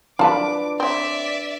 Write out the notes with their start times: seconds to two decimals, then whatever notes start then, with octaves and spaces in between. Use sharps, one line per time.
0.19 D4 F4 B4 A5 D6
0.80 C4 C#5 D5 E5